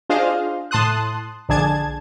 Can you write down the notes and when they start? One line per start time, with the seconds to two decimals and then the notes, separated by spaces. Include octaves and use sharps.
0.10 D4 F4 G#4 C5 D#5 F5
0.71 A2 A5 C6 D#6 F#6
1.49 A#1 D3 D4 G#4 A5 G#6